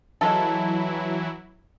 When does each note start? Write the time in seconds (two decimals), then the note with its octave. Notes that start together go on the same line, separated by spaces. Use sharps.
0.21 E3 F#3 G#3 E4 F4 A4